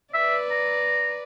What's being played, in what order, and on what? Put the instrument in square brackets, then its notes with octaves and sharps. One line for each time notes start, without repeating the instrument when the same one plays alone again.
[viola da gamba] B4 D5 [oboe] E5
[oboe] A#5